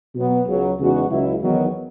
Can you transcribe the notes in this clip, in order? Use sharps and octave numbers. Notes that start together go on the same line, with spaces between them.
B2 F#3 B3
C#2 C#3 F#3
E2 C#3 G#3 D#4 F#4
C#2 C#3 F#3 C#4 E4
E2 D#3 F#3 B3